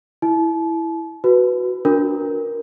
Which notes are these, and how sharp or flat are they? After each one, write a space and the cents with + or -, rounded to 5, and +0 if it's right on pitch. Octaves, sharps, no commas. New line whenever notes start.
E4 +0 A5 -40
F#4 +0 B4 +0
D4 -15 F#4 -45 A#4 +0